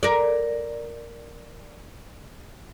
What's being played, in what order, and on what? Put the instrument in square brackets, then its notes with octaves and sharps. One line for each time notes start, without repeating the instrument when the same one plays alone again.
[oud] A#4 D5